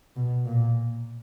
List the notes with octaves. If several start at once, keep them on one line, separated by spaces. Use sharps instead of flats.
B2
A#2